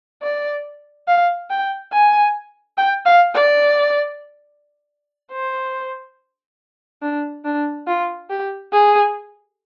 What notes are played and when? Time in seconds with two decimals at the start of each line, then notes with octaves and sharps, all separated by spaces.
0.23 D5
1.08 F5
1.50 G5
1.93 G#5
2.78 G5
3.06 F5
3.35 D5
5.33 C5
7.02 D4
7.45 D4
7.88 F4
8.30 G4
8.73 G#4